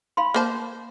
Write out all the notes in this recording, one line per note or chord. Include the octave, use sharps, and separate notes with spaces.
F5 B5 C6
A#3 C5 A5